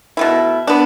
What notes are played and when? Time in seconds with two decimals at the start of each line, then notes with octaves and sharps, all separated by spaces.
0.17 B2 A3 E4
0.67 B3 D4